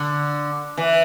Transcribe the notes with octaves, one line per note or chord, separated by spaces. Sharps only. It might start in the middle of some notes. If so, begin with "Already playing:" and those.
Already playing: D3
E3